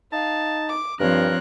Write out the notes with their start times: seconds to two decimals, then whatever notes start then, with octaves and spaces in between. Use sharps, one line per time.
0.12 D#4 F5 A5
0.69 D6
1.00 G2 F3 C4 A#4 C#5 F#6